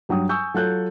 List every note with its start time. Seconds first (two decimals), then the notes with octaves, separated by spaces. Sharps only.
0.09 G2 F#3 G5 D#6
0.29 G#5 C#6 D#6 E6 G6
0.54 F#3 F4 A4 C#5 F#6 G6